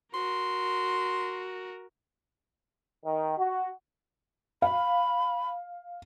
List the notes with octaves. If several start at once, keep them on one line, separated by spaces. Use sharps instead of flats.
F#4 A#4 C6
D#3
F#4
F5 B5